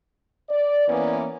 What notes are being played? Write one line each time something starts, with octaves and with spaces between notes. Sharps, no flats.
D5
E3 A#3 B3 C#4